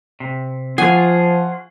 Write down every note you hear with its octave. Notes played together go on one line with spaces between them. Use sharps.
C3
F3 F4 G#4 F#5 G#5 C#6